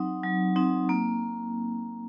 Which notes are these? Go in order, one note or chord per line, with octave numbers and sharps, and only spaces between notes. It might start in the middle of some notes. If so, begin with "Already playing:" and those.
Already playing: F#3 C4 D#4
F#3
C4 D#4
A#3